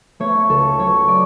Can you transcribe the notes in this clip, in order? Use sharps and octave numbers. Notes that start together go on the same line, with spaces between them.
A3 C#5
C#2 A4
F#3 C#5
D5